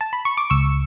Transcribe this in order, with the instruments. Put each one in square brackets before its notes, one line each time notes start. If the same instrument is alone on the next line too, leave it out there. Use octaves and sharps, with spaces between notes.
[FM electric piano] A5
B5
C#6
D6
C#2 C#6 E6